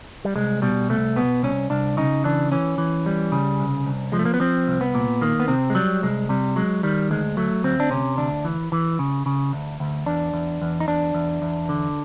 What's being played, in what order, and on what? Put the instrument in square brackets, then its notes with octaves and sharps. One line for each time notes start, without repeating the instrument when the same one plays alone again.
[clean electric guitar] G3
C2 G#3
B2 G3
C2 A3
B2 B3
C2 C#4
C2 D4
C#3 D#4
E3 D4
E3 C#4
E3
G3
C#3
C2
C2
F3 G#3
A3
A#3
B3
F3 C4
C2
B3
A#2
D#3 A#3
B3
C3 C4
G#3
F#3 G3
C2 G#3
C3 G3
F#3 G#3
D#3 G3
D2 G#3
F#3 A3
D2 C4
D4
C3 C#4
D2 D4
E3
E3
C#3
C#3
D2
D2
E2 D4
E2
E2
D#4
E2 D4
E2
E2
D3